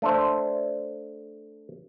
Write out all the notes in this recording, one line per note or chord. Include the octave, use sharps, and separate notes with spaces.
A3 D4 A4 C5